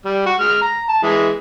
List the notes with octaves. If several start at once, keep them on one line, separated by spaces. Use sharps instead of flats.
G3
F#4
G#3 F6
A#5
A5
E3 G#3